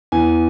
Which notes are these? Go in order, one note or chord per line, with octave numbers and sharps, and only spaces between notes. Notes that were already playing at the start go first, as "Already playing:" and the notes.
E2 G#5